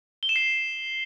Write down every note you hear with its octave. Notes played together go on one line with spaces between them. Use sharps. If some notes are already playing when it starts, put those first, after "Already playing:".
G7
E7
C7